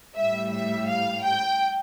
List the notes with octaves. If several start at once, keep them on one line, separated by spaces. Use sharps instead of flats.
A2 G3 E5
E5
F5
G5